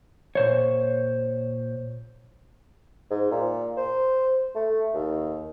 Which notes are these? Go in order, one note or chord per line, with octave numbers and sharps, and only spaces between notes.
A#2 C5 C#5
G#2
A#2
C5
A3
D#2